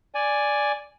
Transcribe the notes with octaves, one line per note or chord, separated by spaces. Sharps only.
D5 G#5